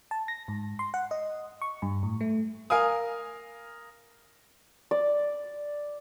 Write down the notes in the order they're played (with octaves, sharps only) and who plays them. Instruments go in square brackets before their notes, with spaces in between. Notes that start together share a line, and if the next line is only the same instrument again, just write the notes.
[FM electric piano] A5
A#6
G#2
C6
F#5
D#5
C#6
G2
A2
A3
[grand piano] A#4 F5 G#5 D#6
[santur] D5